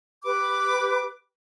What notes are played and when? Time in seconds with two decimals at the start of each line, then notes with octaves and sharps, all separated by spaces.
0.24 G4 B4 B5 D6